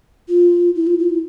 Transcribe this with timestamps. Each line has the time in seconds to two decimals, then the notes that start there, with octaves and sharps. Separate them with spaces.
0.29 F4
0.76 E4
0.87 F4
0.99 F4
1.10 E4